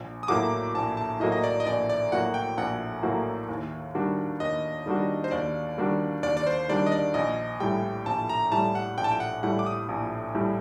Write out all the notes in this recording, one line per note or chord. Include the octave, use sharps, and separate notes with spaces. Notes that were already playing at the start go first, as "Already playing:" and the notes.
Already playing: A#1
D#6
A2 F#3 A#3 F#4 D6
A#1 A5
A5
A2 F#3 A#3 F#4 D#5
D#5
D5
D#5
A#1 D5
D5
A2 F#3 A#3 F#4 F#5
G5
A#1 F#5
A2 F#3 A#3 F#4
D#2
D#3 G3 D4 F#4
D#2 D#5
D#3 G3 D4 F#4
C5
D#2 D5
D#3 G3 D4 F#4
D#2 D5
D5
C5
D#3 G3 D4 F#4 D5
D#5
D5
A#1 D#5
A2 G3 G5
A#1 A5
A#5
A2 G3 A5
F#5
A#1 G5
A5
G5
F#5
A2 G3 F#5
D6
D#6
A#1
A2 G3